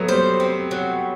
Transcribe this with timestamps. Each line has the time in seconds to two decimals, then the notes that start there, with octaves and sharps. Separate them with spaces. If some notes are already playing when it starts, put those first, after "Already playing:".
Already playing: F#3 A3 B3
0.08 G3 C5
0.40 C4
0.71 F#3